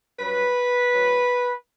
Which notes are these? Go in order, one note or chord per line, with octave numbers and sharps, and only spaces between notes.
G2 F#3 B4
A2 F#3